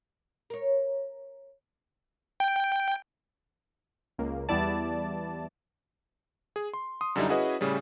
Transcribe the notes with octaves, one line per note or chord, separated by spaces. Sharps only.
A#4 C#5
G5
C#2 A#3
E2 G3 B3 E4 D5 A5
G#4
C6
C6 D#6
F#2 D3 G3 D#4 E4
C#4 E4 F#4 G#4 B4 D#5
A2 C#3 G3